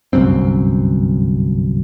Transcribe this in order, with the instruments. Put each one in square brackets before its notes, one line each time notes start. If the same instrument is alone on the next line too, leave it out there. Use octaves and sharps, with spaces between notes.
[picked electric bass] G1 C2 F#2 C4